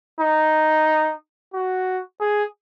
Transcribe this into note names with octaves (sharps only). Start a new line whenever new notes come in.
D#4
F#4
G#4